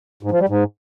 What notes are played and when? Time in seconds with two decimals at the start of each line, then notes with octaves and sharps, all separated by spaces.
0.23 G#2
0.31 F3
0.40 G3
0.49 G#2